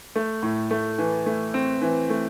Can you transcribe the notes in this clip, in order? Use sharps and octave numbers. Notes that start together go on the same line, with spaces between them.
A3
A2
A3
E3
A3
C4
E3
A3